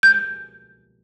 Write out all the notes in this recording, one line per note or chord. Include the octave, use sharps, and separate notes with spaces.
G6